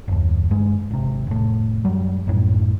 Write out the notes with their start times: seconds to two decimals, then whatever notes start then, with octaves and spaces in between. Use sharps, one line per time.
0.08 F#1 D#2
0.51 G2 G#3
0.91 G#1 C3
1.27 F1 A2
1.85 F#2 F#3 G3
2.27 A#1 F#2 A2